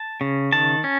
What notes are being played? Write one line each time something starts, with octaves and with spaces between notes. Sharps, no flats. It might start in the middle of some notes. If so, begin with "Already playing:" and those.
Already playing: A5
C#3
D#3 A5
C#4